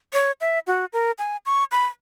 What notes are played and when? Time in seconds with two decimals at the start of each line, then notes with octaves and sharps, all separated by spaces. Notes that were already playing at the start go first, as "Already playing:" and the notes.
0.13 C#5
0.41 E5
0.67 F#4
0.93 A#4
1.18 G#5
1.46 C#6
1.72 B5